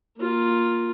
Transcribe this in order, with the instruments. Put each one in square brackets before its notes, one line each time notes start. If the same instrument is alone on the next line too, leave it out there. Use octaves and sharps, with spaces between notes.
[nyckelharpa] A#3 F4